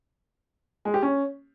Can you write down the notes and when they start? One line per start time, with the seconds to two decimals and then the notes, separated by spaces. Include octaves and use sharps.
0.85 G#3
0.94 G4
1.03 C#4